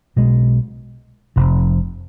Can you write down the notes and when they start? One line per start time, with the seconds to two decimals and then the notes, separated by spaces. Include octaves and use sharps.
0.16 B1 B2 G#3
1.36 F1 F2 C3